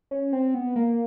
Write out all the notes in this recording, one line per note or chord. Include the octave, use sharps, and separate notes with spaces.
C#4
C4
B3
A#3